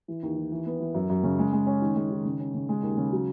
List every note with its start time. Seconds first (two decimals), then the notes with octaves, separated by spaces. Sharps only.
0.08 E3
0.23 D#2
0.37 E3
0.52 E3
0.66 B3
0.80 E3
0.94 F#2
1.09 F#2
1.23 C#3
1.39 G#3
1.53 G#3
1.67 C#4
1.82 D#3
1.96 G#3
2.11 D#3
2.25 C#3
2.40 C#4
2.54 C#3
2.69 G#3
2.83 D#2
2.98 C#3
3.12 F#3